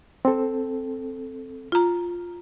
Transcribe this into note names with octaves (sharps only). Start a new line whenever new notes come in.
C4 A4
F4 A#5